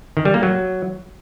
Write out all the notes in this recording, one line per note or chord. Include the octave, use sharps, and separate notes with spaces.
D#3
G3
A#3
F#3